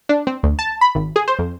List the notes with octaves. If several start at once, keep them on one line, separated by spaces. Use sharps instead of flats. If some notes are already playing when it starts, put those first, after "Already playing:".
D4
C4
D2
A5
B5
G#1
G#4
C5
F2